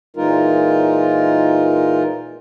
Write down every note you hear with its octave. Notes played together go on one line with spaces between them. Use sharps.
A#2 E3 G#3 D#4 F4 A#4